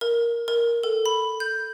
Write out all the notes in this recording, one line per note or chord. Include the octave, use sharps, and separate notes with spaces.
A#4
A#4
A4
B5
G6